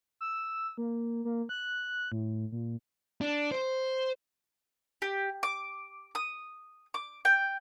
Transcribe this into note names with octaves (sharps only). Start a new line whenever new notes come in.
E6
A#3
A#3
F#6
A2
A#2
D4
C5
G4
D6
D#6
D6
G5